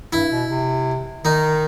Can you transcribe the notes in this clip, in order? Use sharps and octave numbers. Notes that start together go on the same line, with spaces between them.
G2 E4
B2
C3
D#3 D#4